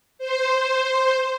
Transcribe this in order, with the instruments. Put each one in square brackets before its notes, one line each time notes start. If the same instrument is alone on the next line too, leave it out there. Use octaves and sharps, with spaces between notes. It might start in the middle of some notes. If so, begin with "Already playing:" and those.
[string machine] C5